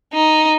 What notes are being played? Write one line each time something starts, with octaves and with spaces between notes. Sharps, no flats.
D#4